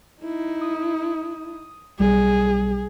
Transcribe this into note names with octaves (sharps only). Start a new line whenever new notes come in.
D#4 E4
D#6
B1 G3 G#4